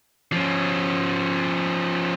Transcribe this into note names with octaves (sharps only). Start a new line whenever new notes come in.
F3 C#4